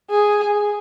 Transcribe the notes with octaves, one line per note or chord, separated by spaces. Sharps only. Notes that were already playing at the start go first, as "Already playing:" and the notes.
G#4